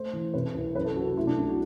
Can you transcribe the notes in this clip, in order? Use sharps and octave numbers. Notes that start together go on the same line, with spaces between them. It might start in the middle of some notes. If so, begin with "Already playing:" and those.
Already playing: A3 C5
E3
C3 B4
C2
F#2 B4
A4
F#2 F#4
F#4
A3 E4
D4
C2
F#4